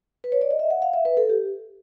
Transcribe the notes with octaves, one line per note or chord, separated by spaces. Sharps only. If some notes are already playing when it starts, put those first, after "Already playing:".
B4
C#5
D5
D#5
E5
F#5
F5
E5
B4
A4
G4